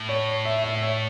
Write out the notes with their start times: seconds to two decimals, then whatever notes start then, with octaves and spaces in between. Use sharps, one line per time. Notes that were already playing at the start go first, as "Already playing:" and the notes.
Already playing: A2
0.09 C#5
0.45 E5
0.64 E5
0.76 E5
0.82 C#5